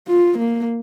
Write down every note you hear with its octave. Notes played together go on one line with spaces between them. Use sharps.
F4
A#3